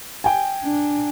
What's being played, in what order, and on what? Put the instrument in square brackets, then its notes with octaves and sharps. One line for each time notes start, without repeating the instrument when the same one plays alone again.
[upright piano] G5 G#5
[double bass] D4